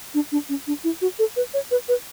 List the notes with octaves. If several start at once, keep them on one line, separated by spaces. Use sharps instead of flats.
D4
D4
C#4
D4
E4
F#4
A4
B4
C#5
B4
B4